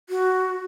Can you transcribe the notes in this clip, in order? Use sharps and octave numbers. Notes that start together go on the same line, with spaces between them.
F#4